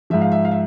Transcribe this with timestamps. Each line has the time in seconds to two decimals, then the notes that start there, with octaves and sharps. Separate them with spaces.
0.10 G#2 F3 E5
0.21 F5
0.32 E5
0.45 F5
0.51 E5